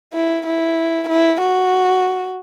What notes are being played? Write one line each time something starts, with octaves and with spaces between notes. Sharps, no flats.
E4
E4
E4
F#4